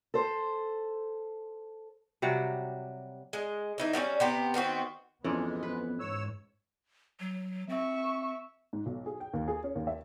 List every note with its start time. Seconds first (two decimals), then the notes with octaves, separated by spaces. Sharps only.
0.14 A4 C5
2.22 C3 F#3 G3 F#4
3.33 G#3
3.78 E3 D#4 E4
3.93 F#3 G3 B3 C#4
4.20 C3 B3 G4
4.54 D#3 B3 C4 F#4
5.24 F2 E3 G#3 B3 C#4 D5
5.63 B4
6.00 G#2 C#5 E6
7.20 F#3
7.69 C4 E5 C#6
8.73 G#2
8.86 B1
9.06 G#4
9.20 G5
9.34 D#2
9.48 G#4
9.64 C#4
9.75 D#2
9.87 E5